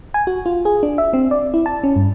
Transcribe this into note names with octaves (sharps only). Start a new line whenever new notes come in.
G#5
F#4
F4
G#4
D4
E5
C4
D5
E4
A5
C#4
G2